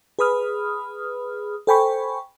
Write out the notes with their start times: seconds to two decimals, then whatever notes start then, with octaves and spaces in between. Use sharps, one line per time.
0.19 G#4 B4 B5 D#6 F6
1.67 A4 C5 G5 G#5 B5 C#6